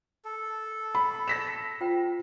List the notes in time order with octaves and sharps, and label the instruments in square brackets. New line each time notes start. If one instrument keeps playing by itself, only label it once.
[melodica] A4
[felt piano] B5
A#6 B6 E7
[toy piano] F4 C5 G5